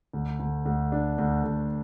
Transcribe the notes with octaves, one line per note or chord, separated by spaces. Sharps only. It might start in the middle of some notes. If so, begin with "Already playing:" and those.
D2
D2
D2
D4
D2
D2